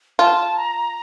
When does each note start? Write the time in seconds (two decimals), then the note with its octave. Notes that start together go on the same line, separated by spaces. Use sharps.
0.19 F4 A5
0.57 A#5